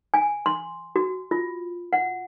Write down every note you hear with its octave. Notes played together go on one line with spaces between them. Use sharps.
G#5
C6
F#4
F4
F#5